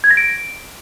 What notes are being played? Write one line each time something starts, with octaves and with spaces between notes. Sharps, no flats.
G#6
A#6
D7